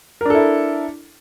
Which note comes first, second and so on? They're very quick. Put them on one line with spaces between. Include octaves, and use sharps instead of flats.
A#4 D4 A4 E4